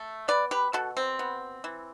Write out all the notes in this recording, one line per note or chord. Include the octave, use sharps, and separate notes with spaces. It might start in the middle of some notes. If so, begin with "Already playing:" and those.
Already playing: A3
B3 B4 D5
G4 B4
B2 F#4 A4
C4
B3
E3